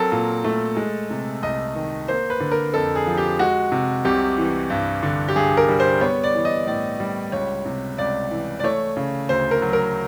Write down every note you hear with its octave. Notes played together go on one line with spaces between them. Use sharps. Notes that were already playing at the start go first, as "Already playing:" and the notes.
Already playing: F#3 C4 A4 A#4
A#2
A3
G#3
C3
C2 D#5
D#3
A#3 C5
B4
D3
A#4
F2 A4
G#4
F3
G4
G#3 F#4
C3
C2 G4
E3
G2
D3
G4
G2 G#4
A#4
G3
C5
B3 C#5
D5
E3
D#5
A2 D5
G3
C#2 C#5
C3
C#2 D5
E3
D5
A3 C#5
C#3
D2 C5
A#4
F#3
A#4